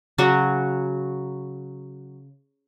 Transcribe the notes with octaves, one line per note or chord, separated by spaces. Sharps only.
C#3 F#3 F#4